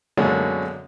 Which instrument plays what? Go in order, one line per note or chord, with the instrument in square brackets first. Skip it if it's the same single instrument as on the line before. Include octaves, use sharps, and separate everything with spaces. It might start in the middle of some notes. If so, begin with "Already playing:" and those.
[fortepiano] F#2 B2 D3 G#3 A#3 C#4